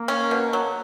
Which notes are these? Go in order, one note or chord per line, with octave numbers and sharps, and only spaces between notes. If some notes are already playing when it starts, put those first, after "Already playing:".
Already playing: A#3
C#4
B2
F#3